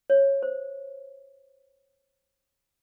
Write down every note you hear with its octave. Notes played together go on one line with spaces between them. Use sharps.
C#5
C5